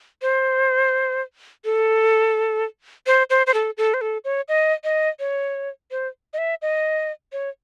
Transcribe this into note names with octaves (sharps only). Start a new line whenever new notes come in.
C5
A4
C5
C5
C5
A4
A4
C5
A4
C#5
D#5
D#5
C#5
C5
D#5
E5
D#5
C#5